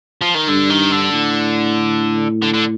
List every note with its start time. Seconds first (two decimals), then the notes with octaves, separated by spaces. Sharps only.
0.21 F3
0.34 D#3
0.48 G2 D3
0.70 D#3
0.92 D3
1.13 A2
2.42 D3
2.54 D3